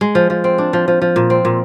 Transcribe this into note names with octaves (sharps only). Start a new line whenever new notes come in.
G#3
F3
F3
C4
D4
F3
F3
F3
A#2
C4
A#2